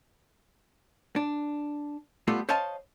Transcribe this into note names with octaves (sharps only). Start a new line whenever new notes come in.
D4
G3 A3 B3 F4 G4 A4
C5 C#5 D#5 F5 A5